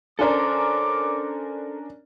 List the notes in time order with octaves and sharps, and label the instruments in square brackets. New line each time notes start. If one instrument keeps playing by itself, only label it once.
[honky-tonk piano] C#4 D4 A#4 [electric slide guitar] A4 C5 [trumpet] D6